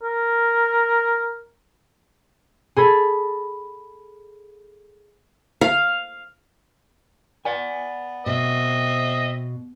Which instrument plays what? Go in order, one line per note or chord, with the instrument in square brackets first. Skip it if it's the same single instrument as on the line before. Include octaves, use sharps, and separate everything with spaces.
[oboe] A#4
[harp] G#4 A4 B5
[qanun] F5
[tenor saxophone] B3 [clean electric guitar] D5 G#5
[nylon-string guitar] B2 [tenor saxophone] C4 [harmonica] D#5 E5